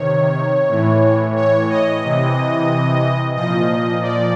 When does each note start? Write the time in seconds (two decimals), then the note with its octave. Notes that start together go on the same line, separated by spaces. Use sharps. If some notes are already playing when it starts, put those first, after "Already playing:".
Already playing: C3 D#3 C#5
0.69 A2 E3
1.36 C#5
1.69 D#5
2.02 C3 E3
3.35 A#2 F3 D#5
4.02 D5